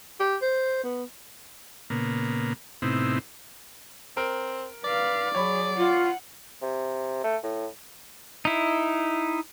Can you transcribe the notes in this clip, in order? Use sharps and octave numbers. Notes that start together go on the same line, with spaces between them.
G4
C5
B3
A#2 C#3 A#3 B3
A2 C3 B3 C4 D#4 E4
C4 A#4
B4 D5 F5
F#3 G#4 C#5 B5
F4 F#5
C3
A3
A2
D#4 E4